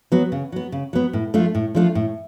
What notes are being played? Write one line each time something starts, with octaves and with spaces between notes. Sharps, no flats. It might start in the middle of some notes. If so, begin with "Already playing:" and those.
F#3 B3
C#3
F#3 B3
C#3
F#3 B3
A2
F3 A3 D4 F4
A2
F3 A3 D4 F4
A2